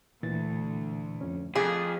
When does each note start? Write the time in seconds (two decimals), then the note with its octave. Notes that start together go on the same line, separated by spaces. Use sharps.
0.23 D2 A#2 E3 A6
1.21 F2 C#4
1.56 F2 G#4 D6